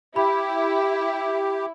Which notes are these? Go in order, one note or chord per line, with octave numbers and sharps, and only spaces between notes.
E4 G4 B5